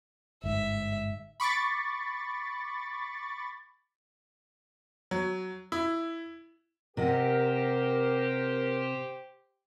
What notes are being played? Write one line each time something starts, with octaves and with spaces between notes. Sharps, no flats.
G1 G#2 E5
B5 C#6 D6 A6
F#3
E4
C3 G4 A#4 C5 D#5 F#5